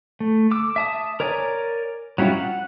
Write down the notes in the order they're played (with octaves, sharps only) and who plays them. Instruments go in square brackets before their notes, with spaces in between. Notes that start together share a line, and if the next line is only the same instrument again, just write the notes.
[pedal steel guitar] A3
D6 E6
E5 A5 D#6
A#4 C#5 D5 G#5 A#5
F#3 G3 C#4 E4 F4
F#5